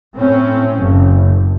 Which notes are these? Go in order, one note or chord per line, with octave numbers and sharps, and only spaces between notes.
A2 C4 C#4
F#1